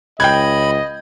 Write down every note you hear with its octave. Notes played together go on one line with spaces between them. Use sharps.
C#2 D#5 G5 B5 G6 G#6